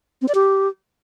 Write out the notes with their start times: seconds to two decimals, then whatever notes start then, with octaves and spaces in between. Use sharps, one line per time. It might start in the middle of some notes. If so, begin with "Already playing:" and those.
0.22 C4
0.28 D5
0.35 G4